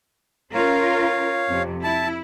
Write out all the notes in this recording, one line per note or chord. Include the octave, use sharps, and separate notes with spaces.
C#4 F4 A#4 C#5 F5
F2 C3
E4 A5